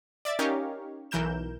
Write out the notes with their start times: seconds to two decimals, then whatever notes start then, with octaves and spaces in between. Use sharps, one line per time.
0.25 D5 E5 A6
0.39 C#4 D#4 G4 A#4 C#5 F5
1.11 B1 E3 A#4 G6 E7